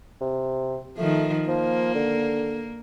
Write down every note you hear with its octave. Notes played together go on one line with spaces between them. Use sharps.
C3
D#3 F3 A3
F3 A#3
D3